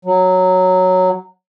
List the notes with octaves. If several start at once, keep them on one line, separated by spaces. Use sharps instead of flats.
F#3